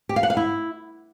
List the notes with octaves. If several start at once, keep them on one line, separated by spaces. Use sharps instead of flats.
G4
F5
F#5
F5
E4